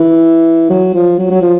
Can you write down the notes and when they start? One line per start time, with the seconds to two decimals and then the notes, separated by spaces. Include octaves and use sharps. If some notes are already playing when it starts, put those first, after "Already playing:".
Already playing: E3
0.70 F#3
0.94 F3
1.18 F#3
1.30 F#3
1.42 F3